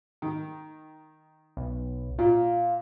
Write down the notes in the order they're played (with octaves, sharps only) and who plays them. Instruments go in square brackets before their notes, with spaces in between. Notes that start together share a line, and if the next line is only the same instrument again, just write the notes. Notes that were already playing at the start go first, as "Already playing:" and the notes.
[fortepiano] D#3
[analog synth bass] B1
[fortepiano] A#2 [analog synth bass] F4